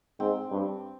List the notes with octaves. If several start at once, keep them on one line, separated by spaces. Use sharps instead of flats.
G#2 C4
G2